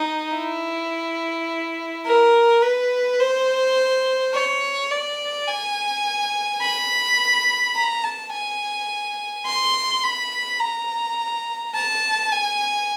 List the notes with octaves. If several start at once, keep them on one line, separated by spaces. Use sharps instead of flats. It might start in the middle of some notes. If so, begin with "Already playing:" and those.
Already playing: D#4
E4
A#4
B4
C5
C#5
D5
G#5
B5
A#5
A5
G#5
C6
B5
A#5
A5
G#5